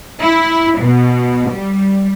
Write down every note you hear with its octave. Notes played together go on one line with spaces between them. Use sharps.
E4
B2
G3